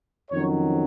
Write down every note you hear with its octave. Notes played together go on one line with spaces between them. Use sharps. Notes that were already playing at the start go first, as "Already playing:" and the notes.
F2 D#3 F#3 C#4 C#5